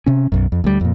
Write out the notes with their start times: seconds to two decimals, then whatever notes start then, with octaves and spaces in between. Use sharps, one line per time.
0.06 C3 C#4
0.32 B1 F#2
0.52 F2
0.64 D2 G3
0.81 F2 A#2